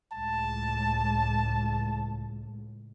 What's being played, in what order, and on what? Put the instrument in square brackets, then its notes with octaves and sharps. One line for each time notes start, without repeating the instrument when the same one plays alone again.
[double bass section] C#2 A2 [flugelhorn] A5